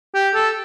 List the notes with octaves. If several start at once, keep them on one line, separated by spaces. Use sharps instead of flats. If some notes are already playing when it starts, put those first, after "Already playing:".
G4
A4